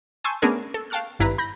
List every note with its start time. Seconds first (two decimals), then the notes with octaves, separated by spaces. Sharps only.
0.24 G#5 A5 C6 C#6 E6 G6
0.42 A3 B3 C#4 D4 G#4 A#4
0.74 A4
0.90 F5 G5 A5 C#6 F6 F#6
1.19 G#1 G2 E4 B4 A#5 B6
1.38 B5 G6 A#6